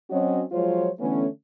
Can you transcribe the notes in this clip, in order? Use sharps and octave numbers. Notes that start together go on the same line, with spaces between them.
F#3 C4 C#4 F#4 C#5 D#5
F3 F#3 G#3 F4 C5 C#5
D3 E3 A3 B3 C#4